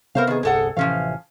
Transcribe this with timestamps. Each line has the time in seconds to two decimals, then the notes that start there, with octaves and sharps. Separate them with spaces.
0.15 C3 A#3 B3 A#4 C5 F5
0.27 D#3 G#4
0.43 G1 C2 G#4 A4 F#5
0.77 A1 C3 E3 F3 C#4 F5